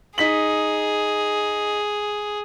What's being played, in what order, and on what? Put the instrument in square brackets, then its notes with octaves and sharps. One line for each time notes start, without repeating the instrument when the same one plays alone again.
[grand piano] D#4 B6 F#7 [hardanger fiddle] G#4